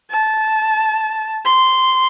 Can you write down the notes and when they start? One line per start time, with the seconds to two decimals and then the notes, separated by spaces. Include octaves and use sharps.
0.10 A5
1.45 C6